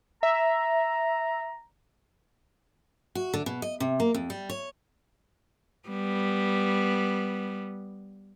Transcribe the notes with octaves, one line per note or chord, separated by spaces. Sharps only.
E5 A#5
F#4
D3
B2
D#5
C3
A#3
F2
G3
C#5
G3 B3